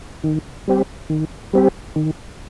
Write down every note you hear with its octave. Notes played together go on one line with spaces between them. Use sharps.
D#3
G3 C4 G4
D#3
G3 C4 G4
D#3